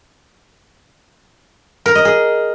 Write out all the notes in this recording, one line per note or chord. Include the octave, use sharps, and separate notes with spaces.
A#4
D#5
G#4